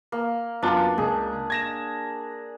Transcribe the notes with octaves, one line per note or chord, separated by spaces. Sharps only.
A#3
F#2 B3 D4 F4
C#2 G#4
G#6 A#6 E7